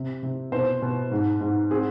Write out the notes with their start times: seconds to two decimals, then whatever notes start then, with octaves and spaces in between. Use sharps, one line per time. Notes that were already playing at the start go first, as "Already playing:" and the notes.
Already playing: C3
0.23 C3
0.52 B2 C5
0.82 B2
1.11 G#2
1.41 G#2
1.70 C4 G#4